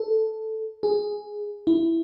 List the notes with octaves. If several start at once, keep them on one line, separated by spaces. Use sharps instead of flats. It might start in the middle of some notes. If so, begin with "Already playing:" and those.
Already playing: A4
G#4
E4